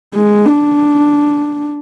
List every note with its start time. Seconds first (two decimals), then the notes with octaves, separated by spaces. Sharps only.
0.15 G#3
0.46 D4